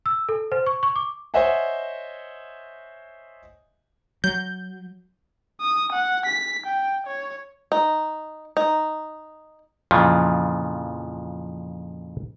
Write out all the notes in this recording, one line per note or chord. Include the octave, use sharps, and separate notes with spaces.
E6
A4
C5
C#6
C#6
D6
C5 C#5 D#5 E5 F#5 G#5
F#3 G6
D#6
F#5
B6
G5
C#5
D#4
D#4
F2 A#2 C#3 E3 F3